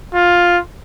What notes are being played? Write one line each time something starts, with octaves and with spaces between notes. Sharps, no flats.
F4